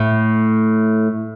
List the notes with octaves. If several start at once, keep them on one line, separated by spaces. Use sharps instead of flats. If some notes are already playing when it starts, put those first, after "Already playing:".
Already playing: A2